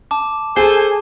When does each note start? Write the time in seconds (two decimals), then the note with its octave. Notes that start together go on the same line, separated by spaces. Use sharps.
0.11 A5 D6
0.57 G#4 A4 C5 G#5